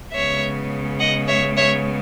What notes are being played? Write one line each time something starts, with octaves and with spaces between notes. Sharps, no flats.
C#3 G#3 B3 C#5 E5
D#5 F#5
C#5 E5
C#5 E5